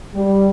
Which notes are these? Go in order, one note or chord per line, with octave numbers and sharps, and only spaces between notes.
G3